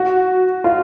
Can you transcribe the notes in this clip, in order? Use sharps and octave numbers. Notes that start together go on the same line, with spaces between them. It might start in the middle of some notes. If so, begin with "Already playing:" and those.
Already playing: F#4
F4